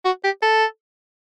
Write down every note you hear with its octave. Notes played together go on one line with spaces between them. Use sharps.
F#4
G4
A4